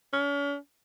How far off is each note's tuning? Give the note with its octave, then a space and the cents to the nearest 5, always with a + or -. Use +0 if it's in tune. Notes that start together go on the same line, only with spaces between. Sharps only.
C#4 +40